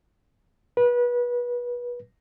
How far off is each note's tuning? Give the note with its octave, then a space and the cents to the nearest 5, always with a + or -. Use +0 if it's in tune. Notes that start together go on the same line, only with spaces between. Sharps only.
B4 -30